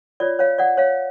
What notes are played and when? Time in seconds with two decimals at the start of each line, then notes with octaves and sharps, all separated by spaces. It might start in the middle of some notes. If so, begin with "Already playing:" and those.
0.20 F4 A4 C#5 D5
0.39 C#5 F5
0.58 D5 F#5
0.77 C#5 F5